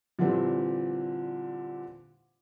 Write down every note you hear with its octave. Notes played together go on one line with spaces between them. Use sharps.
A#2 D3 E3 G3 C4